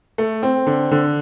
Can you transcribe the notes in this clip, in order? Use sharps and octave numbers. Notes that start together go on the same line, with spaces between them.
A3
C4
D3
D3